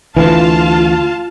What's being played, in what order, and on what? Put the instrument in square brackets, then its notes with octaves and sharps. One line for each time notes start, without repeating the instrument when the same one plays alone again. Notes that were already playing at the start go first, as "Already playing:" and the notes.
[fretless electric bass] D2 E3 [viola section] F4 F5 A5